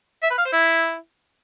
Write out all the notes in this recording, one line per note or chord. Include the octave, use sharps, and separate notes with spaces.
E5
B4
F5
C5
E4